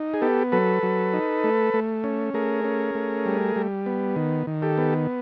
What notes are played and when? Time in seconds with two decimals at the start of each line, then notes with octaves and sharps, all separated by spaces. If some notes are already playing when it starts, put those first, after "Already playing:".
Already playing: D#4
0.14 G#4
0.22 B3 G4 A4
0.52 F#3 A4 B4
0.83 F#3
1.14 D#4
1.44 A3
1.74 A3
2.04 C#4
2.34 A3 G#4 A#4
2.64 C#4
2.95 A3
3.26 G3
3.56 G3
3.86 B3
4.16 D#3
4.47 D#3
4.62 G4 A4
4.78 B3